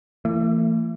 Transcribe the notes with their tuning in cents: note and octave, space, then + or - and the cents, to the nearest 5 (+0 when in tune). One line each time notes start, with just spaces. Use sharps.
E3 +25 A3 +40